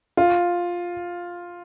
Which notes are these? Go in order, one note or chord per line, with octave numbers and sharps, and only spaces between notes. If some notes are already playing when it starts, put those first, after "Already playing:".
F4